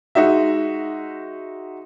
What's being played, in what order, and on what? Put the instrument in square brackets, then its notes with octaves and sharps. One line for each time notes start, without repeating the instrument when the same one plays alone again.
[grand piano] G#3 D#4 F#4 E5